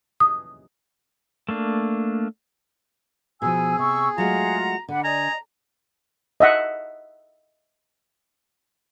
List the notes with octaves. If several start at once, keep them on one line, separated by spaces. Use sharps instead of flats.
D#6
A3 A#3 D4
B2 F3 G#4 G#5 E6
C3 C#6 E6
F#3 G#3 A3 F4 F#5 A#5
D3 D4 F#5 B5
D5 D#5 G#5 A#5
D#5 E5 F#5